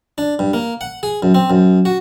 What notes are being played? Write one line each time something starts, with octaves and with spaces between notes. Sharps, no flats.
D4
G2
A#3
F#5
G#4
F#2
C4
F#2
F#4